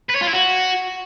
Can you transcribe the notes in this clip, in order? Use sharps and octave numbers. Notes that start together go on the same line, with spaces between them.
B4
C#5
F4
E4
F#4